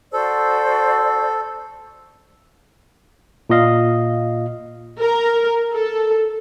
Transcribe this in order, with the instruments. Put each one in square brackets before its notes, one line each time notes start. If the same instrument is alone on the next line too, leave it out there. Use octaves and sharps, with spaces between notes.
[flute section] F#4 C5 D5 [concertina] A4
[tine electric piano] A#2 F4 D#5 F5
[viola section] A#4
A4